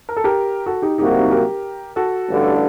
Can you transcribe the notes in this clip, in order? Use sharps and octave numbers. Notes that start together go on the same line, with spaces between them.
A#4
A4
G4 A#4
F#4 A4
D#4 G4
C2 C3 F#3 A#3 D#4 F#4 G4
D#4 G4
C4 D#4
G4 A#4
F#4 A4
A1 G2 D3